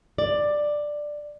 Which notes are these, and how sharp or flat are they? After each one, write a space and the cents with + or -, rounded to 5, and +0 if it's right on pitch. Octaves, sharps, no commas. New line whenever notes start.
D5 +10